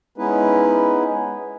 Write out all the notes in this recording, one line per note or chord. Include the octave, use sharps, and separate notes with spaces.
G#3 B3 C#4 D#4 E4 B4